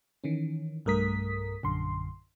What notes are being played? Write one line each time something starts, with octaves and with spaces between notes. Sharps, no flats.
D#3 E3 C#4
B1 G2 A3 A#4 D#6 B6
A#1 F#2 D3 C6